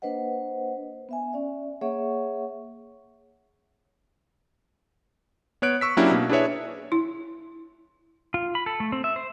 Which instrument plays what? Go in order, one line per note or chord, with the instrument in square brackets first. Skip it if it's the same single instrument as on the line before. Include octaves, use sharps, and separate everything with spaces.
[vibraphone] A#3 D4 B4 C5 D#5 F#5
B3 E5 G#5
C#4 D5 E5
A#3 G#4 C#5 E5 F#5 C#6
[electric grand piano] B3 C#5 F#6 D7
C#6 E6 B6
F#3 A#3 C#4 D4 E4 G4
B2 A#3
D4 E4 G#4 B4 C#5 E5
[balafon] E4
[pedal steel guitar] F4
B5
A4
A3
C4
E5
C5